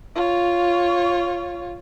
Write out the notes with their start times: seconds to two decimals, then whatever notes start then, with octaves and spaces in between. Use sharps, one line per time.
0.15 F4 C#5